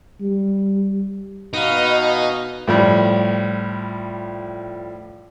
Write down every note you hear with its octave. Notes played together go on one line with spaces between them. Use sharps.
G3
B2 D#4 B4 F5
A2 F3 G3